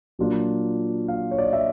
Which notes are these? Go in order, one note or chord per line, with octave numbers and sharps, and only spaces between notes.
A#2 F#3 A#3 D4 F4
F5
C#5
D5
D#5
E5